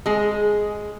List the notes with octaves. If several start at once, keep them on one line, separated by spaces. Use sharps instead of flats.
G#3 G#4